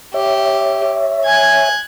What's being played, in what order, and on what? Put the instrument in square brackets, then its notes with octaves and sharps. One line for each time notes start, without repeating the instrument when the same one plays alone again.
[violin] G4 [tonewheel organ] C#5 E5
[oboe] G#5 [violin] F#6 G#6